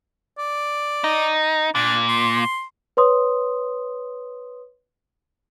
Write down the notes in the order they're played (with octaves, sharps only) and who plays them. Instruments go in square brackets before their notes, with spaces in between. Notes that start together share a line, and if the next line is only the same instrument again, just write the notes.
[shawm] D5
[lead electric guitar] D#4
[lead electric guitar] A#2 [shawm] D4
[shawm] C6
[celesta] B4 C#5 C6 D#6